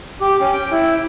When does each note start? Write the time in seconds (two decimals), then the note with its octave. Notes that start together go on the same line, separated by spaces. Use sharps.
0.21 G4
0.41 C#4
0.53 G5
0.72 E4